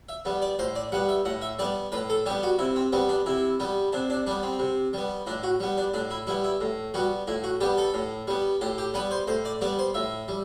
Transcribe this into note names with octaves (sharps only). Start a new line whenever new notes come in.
E5
G3 B3
D5
A2 C5
D5
G3 B3 F#5
E5
A2 F#5
E5
G3 B3 D5
A2 B4
A4
G3 B3 G4
F#4
C3 E4
C4
G3 B3 C4
D4
C3 E4
G3 B3
C3 D4
D4
G3 B3 D4
C4
C3
G3 B3
A2 D4
F#4
G3 B3
D4
A2 D4
E4
G3 B3 E4
E4
A2
G3 B3 F#4
A2 E4
F#4
G3 B3 G4
A4
A2
G3 B3
A2 G4
G4
G3 B3 B4
C5
A2 C5
D5
G3 B3 D5
C5
A2 E5
G3